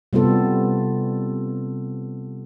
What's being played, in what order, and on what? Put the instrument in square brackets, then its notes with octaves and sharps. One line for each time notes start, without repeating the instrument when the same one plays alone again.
[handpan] C3 G3 B3 C4 F4 A4